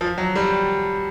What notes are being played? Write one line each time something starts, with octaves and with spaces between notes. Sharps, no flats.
F3
F#3
G3